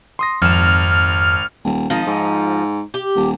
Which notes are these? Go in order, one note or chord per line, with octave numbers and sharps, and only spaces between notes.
C6 D#6 A#6
G#1 F2 F6 E7
D#1
G#1 F3 D#4
G#2
G4
D#1